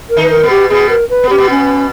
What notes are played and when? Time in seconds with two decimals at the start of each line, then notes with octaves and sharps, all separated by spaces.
0.10 A#4
0.17 D#3 D#4
0.23 B4
0.30 A#4
0.43 B2 B3
0.50 G4
0.70 B2 B3 G#4
0.90 A#4
1.09 B4
1.24 B3
1.30 C#4 G4
1.38 B2 B3
1.50 C#4